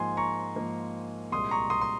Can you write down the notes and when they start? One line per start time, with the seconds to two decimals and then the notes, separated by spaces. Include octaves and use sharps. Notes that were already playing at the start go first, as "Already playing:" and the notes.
Already playing: G#2 F3 A#3 G#5 C6
0.17 A#5 C#6
0.56 G#2 F3 A#3
1.32 C2 A#2 G#3 C6 D#6
1.51 A#5 C#6
1.70 C6 D#6
1.81 C6